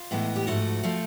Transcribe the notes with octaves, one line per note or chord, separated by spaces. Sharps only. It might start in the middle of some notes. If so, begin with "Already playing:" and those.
Already playing: F4
A2 E3 G#3 B3
G4
G#2 F3 A3 F#4
F3 A3